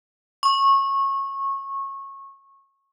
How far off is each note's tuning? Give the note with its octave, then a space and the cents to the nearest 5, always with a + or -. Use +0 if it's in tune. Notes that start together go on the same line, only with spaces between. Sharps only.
C#6 -20